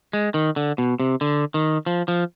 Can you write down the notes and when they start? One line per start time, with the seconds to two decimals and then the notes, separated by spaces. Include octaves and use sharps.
0.13 G#3
0.34 D#3
0.56 D3
0.78 B2
1.00 C3
1.21 D3
1.54 D#3
1.86 F3
2.08 F3